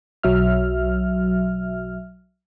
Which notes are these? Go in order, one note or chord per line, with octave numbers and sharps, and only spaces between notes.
B1 F#3 E5 F6